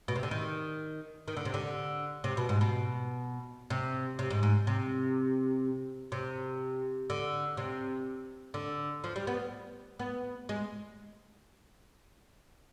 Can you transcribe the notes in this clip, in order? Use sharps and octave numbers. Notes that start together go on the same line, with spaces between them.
B2
C3
D3
D#3
D#3
D3
C3
D3
C3
B2
G#2
B2
C3
C3
G#2
G#2
C3
C3
D3
C3
D3
F3
G3
B3
B3
G#3